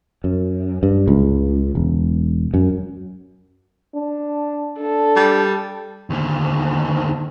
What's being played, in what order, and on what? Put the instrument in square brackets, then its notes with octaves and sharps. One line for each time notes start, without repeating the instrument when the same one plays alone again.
[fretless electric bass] F#2
G2
C#2
E1
F#2
[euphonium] D4
[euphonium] D4 [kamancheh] A4
[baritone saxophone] G3
[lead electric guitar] D#2 D3